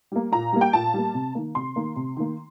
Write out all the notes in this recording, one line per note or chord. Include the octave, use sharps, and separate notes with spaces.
G3 A#3
A#2 A#5
G3 A#3
G5
A#2 A5
G3 A#3
C3
D#3 A#3
C3 C6
D#3 A#3
C3
D#3 A#3